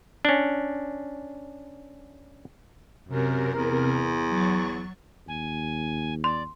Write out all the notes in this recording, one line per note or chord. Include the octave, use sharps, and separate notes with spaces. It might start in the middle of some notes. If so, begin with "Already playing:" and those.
C#4 D4
F#2 C3 A#4
E2
F#3 C#6 A6
D#2 G#5
D5 C6